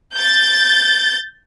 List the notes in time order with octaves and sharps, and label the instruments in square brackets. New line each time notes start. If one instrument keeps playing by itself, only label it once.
[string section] G6 A6